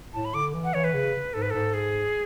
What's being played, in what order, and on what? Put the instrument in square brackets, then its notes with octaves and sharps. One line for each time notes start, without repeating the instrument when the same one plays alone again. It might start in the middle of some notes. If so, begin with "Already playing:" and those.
[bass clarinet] A2 [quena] A5
[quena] B5
[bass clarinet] D3 [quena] D6
[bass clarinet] E3
[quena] F#5
[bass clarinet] E3 [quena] C#5
[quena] B4
[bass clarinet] C#3
[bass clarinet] G#2 [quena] A4
[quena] B4
[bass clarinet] G#2 [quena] A4
[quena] G#4